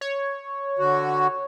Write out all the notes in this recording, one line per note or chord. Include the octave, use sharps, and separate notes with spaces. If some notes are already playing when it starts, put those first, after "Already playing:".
C#5
D3 F#4